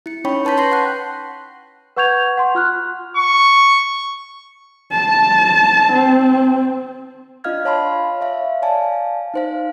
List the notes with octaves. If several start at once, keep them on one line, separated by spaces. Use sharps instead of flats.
E4 C#7
C#4 D#4 C#5 G5 B5 C#6
B4 A5 C6 G6 B6
G5 A5 C6 C#6 A#6 C7
F#5 C6 F#6
B4 F#5 C#6 G6 G#6 F7
F#5 C6
F4 F6 F#6
C#6
A5
C4
D4 F4 D#5 F5 F6 G#6
C#5 F5 A5 B5 C6
C#5 E5 F5
D5 F5 G#5 A5
D#4 C5 F5